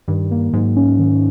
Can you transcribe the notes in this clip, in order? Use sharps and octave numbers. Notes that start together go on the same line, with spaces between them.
G2 D#3
A#3
G#2 F#3
C#4
D#3